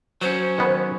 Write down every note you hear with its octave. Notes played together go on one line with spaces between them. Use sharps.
F#3 C#4 C5
D#3 B3